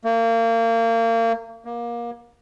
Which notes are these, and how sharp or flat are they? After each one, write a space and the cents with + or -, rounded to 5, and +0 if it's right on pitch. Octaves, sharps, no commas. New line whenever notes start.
A#3 -30
A#3 +25